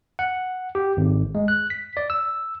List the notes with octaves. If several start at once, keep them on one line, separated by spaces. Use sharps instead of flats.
F#5
G4
G#1
G#3
F#6
B6
D5
E6